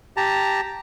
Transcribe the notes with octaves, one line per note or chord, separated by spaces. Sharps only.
G4 A5 A#5